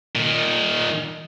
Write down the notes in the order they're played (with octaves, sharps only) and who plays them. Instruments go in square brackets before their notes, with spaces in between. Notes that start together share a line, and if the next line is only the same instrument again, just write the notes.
[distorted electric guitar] A#2 D#3